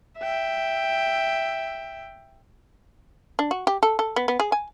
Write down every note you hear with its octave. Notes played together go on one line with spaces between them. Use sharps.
E5 G5
D4
F#4
G4
A4
A4
B3
B3
G#4
G#5